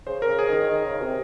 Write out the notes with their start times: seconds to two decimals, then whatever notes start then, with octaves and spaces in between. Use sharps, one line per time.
0.07 C#3 C5
0.22 A#4
0.28 C#3
0.39 G#4
0.49 D#3 G#4
0.69 D#3
0.85 C#3
1.02 C3